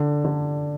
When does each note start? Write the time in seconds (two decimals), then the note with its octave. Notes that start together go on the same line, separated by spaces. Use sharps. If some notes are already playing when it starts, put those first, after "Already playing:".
Already playing: D3
0.25 D3